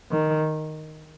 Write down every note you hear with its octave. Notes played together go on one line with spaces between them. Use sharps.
D#3